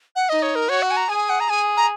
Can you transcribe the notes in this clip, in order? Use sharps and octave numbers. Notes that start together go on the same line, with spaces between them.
F#5
D#4 D#5
C#5
A#4
F#4 C#5
F#5
G#5
A#5
G#4 G#5
F#5
A#5
G#4 G#5
A#5